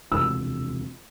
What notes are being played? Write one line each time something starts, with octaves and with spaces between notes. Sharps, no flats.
E1 D2 C3 F3 E6